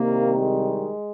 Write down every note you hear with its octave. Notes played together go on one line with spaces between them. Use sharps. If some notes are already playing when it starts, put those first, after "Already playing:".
Already playing: C2 C3 D#3 G3 A#3
G#3